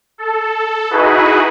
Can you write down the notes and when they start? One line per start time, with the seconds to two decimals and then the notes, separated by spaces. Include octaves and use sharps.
0.18 A4
0.91 D#4 E4 F#4 G#4 B4